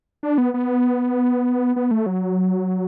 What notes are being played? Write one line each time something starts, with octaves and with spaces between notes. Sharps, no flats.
D4
B3
B3
B3
A3
F#3